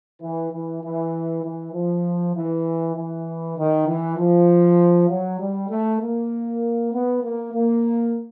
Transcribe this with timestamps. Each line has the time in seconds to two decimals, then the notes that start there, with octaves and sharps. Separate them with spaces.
0.21 E3
0.51 E3
0.82 E3
1.42 E3
1.73 F3
2.34 E3
2.95 E3
3.56 D#3
3.87 E3
4.17 F3
5.08 F#3
5.39 G3
5.69 A3
6.00 A#3
6.92 B3
7.22 A#3
7.52 A#3